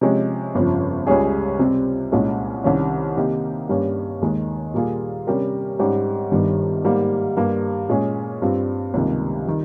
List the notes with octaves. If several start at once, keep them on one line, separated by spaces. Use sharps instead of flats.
C3 F3 G#3 C#4 G4
G1 F2 C#3 F3
C#2 C#3 G3 C#4 G#4
C3 G3 C4
C2 A#2 G#3 C#4
C2 C3 D#3 G3 C#4
C3 D#3 A#3 D#4 G4
G2 G3 A#3 C#4
D#2 D#3 G#3
A#2 G3 A#3 F4 G#4
C3 G3 C#4 G4 A#4
G#2 G3 C#4 G4
G1 G2 D#3 G3
G#2 G3 A#3
G2 G3 A#3
A#2 G#3 C#4 G#4
G2 G3 C4 F4
C#2 C3 D#3 G3 A#3
D#3 G3